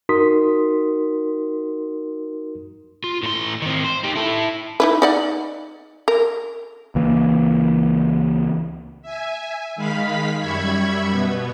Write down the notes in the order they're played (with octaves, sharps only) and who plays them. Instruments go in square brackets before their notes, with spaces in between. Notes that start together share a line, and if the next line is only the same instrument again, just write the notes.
[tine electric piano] D#4 F#4 A#4 C6 D#6 B6
[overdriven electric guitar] F4
A2 C6
D#3 C4
C5
D#4 G4
E4 A4
[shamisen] D#4 E4 B4
D#4 D5 F#5
A#4
[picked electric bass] C#2 E3 A#3
[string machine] E5 G#5
D#3 G#3 F5 B5 B6
F#2 G3 E5 B5 C#6 G#6
B2 B3